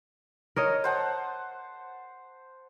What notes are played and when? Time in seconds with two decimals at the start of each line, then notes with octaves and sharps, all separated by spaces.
0.56 A#4 C#5 D#5
0.84 C5 F#5 A5